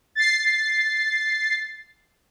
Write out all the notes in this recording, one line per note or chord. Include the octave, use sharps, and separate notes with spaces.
A6 C7